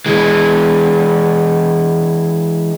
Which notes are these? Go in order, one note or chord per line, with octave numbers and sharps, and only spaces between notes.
E3 G#3